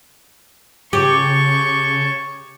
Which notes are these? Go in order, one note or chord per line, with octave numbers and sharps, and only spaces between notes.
C#3 G4 C#5 A5 C#6 G6